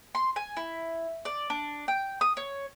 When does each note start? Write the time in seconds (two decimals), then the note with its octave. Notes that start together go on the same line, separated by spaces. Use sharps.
0.15 C6
0.36 G#5
0.57 E4
1.25 D5
1.50 D4
1.88 G5
2.21 D#6
2.37 C#5